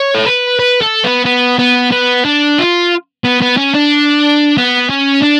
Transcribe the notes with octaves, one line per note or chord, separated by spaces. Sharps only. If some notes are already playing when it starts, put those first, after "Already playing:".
Already playing: C#5
A4
B4
B4
A4
B3
B3
B3
B3
D4
F4
B3
B3
C#4
D4
B3
C#4
D4